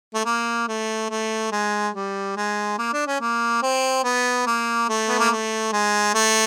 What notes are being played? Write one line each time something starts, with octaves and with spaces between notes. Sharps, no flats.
A3
A#3
A3
A3
G#3
G3
G#3
A#3
D4
C#4
A#3
C4
B3
A#3
A3
B3
A#3
A3
G#3
A3